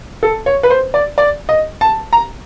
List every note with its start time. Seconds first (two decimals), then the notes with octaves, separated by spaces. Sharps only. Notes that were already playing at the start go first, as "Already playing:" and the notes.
0.23 A4
0.46 C#5
0.63 B4
0.70 C5
0.94 D5
1.18 D5
1.49 D#5
1.81 A5
2.13 A#5